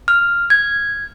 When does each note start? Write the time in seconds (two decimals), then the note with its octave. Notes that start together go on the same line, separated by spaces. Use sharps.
0.08 F6
0.50 G#6